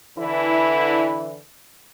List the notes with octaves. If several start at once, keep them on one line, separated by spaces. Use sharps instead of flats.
D3 E3 E4